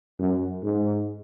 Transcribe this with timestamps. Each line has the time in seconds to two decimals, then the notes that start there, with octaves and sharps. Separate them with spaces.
0.19 F#2
0.64 G#2